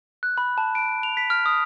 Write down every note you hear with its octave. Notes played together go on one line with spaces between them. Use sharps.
F#6
B5
A5
D7
F7
B6
F6
D#6